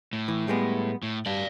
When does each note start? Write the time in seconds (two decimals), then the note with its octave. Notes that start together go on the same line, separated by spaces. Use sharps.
0.13 A2
0.28 E3
0.48 G3 G#3 B3
1.03 A2
1.26 G2 D5 F5